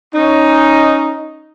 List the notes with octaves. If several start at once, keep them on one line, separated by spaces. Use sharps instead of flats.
C#4 D#4